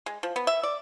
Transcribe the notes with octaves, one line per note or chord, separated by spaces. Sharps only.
G#3
F3
B3
E5
D5